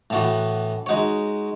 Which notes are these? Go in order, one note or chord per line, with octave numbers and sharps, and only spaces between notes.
A2 E3 B3 F#4
G#3 D#4 F#4 C#5